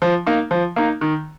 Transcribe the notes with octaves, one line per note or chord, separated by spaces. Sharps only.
F3
A#3 D#4
F3
A#3 D#4
D#3